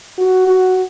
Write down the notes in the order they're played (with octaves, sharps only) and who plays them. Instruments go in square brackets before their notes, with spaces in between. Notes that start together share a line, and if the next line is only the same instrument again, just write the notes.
[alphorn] F#4
F#4